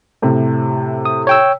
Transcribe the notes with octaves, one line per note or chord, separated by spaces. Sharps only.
A2 C3
D#6
C#5 G5 E6